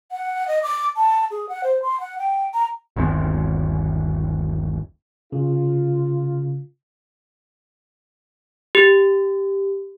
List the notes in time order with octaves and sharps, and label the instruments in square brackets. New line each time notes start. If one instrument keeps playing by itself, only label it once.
[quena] F#5
D#5
D6
A5
G#4
F#5
C5
C6
F#5
G5
A#5
[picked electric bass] G1 D#2 C4
[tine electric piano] C#3 [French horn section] F4
[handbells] G4